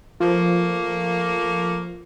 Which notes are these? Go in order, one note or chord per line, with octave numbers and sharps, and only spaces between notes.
F3 A3 A#3